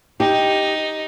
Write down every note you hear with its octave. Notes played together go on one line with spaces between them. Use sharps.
D#4 G4